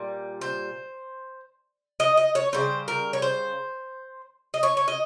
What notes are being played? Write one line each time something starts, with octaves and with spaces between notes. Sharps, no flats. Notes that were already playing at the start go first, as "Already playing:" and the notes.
Already playing: A#2 G3
C5
D#5
D#5
C#5
C#3 G3 C5
A#4
C#5
C5
D#5
C#5
C#5
D#5